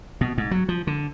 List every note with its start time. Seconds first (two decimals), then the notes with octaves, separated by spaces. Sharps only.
0.21 B2
0.38 G#2
0.51 F#3
0.69 F3
0.87 D3